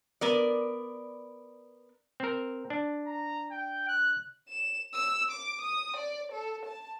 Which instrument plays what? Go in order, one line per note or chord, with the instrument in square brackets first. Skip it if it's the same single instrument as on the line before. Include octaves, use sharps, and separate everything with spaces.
[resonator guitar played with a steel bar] B3 A#4 D5
[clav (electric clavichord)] C4 A#4
D4
[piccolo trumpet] A#5
G5
F#6
[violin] E7
E6
D6
D#6
D5
A4
A5